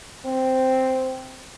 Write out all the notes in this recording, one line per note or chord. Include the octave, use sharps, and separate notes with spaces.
C4